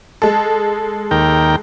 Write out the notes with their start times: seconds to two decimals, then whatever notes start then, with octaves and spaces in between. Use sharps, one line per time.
0.22 G#3 A4
1.11 D#2 A#4 G5